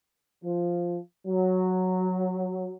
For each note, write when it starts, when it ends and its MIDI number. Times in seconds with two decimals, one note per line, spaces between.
0.44 0.98 53
1.27 2.74 54